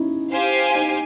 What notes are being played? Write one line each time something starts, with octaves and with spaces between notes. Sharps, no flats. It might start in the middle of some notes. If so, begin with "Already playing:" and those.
Already playing: C#4 D#4 E4
G4 C5 F5 G#5
D#4